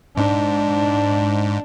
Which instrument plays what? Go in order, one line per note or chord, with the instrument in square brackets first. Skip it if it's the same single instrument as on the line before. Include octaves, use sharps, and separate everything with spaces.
[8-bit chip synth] G#2 [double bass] D4